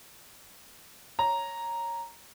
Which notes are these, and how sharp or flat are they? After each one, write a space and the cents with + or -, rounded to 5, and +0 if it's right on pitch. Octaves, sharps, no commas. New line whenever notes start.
C#5 +0 A#5 +0